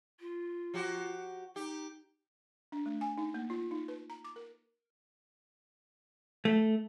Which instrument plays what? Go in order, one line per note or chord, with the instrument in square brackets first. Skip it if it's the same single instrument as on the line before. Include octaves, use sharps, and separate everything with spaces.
[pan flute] F4
[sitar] F3 F#4 G4
[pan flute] D#4 [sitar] G4
[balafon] D4
A3
G#5
D#4
A#3
F4
D#4
B4
A#5
D6
A#4
[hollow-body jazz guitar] A3